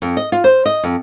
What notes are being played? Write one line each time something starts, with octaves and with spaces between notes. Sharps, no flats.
F2
D#5
F4
C5
D#5
F2